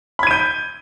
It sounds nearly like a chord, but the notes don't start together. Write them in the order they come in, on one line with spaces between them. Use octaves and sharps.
B5 G#6 D#7 G6